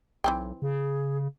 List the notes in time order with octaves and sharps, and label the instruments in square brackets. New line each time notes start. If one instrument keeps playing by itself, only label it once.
[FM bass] B1 [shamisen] E3 C4 G5
[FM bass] C#3 [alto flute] G#4